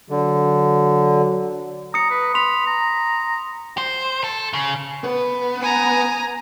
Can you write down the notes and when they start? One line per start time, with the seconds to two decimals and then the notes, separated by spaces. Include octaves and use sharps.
0.10 D3 F#3
1.94 A#5 D#6 C#7
2.10 B4
2.34 B5 C6 F7
2.67 A#5
3.78 C5
4.24 A4
4.53 C#3
5.04 B3 B4
5.62 G#5 A#5